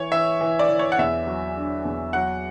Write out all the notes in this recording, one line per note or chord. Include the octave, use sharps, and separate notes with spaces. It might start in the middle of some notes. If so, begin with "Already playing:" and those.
Already playing: E3 C#5
E3 E5
E3
D5
E3
C#5
F#5
E2 E5
F#3
D3
E2
F#3 F#5